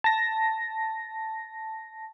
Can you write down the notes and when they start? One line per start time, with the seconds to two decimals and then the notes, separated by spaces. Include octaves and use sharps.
0.04 A5 A#6